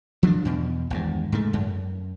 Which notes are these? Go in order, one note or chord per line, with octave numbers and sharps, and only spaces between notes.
F3 F#3 B3 D4
E2 B2
G#1 E2 G2
G#2 C#3 A3
F#2